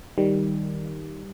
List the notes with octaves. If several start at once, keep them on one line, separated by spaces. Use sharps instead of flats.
D#3 G3